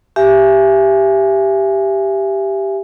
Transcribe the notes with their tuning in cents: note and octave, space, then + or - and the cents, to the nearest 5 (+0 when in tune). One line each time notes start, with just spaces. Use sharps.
G4 +0 E5 +30 G#5 +0